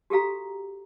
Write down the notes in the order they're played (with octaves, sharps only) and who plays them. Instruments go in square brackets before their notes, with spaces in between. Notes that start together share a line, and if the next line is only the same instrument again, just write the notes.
[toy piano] F#4 G4 A4 F5 A#5